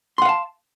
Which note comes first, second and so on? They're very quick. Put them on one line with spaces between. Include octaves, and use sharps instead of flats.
C6 F#5 F5 A5